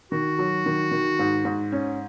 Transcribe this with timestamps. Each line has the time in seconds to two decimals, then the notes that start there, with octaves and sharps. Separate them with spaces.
0.12 D#3 F#4
0.39 F#3
0.66 D#3
0.91 D#3
1.19 G#2
1.45 G#2
1.72 C#4